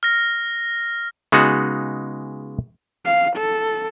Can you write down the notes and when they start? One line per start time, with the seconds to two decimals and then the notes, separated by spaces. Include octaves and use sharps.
0.03 F6 A#6
1.32 C#3 G#3 B3 D#4 F#4
3.05 F5
3.36 A4